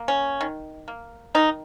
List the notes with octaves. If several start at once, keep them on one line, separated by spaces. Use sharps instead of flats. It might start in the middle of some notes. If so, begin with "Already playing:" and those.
Already playing: A#3
C#4
D#3
A#3
D#3 D#4